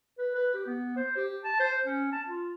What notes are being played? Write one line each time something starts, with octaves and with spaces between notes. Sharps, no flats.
B4
B4
G4
B3
C5
G4
A5
C5
C#4
A5
F4